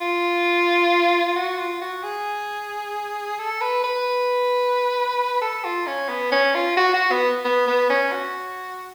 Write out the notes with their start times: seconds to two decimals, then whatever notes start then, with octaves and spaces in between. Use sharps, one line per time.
0.01 F4
1.36 F#4
1.59 F4
1.81 F#4
2.03 G#4
3.39 A4
3.61 B4
3.84 B4
5.41 A4
5.64 F4
5.87 C#4
6.09 B3
6.32 C#4
6.55 F4
6.77 F#4
6.94 F#4
7.11 B3
7.44 B3
7.67 B3
7.90 C#4
8.12 F#4